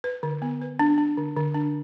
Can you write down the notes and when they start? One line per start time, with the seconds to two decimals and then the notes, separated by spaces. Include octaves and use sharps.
0.04 B4
0.23 D3
0.42 B3
0.61 B4
0.79 D4
0.98 D4
1.17 D3
1.36 D3
1.55 D4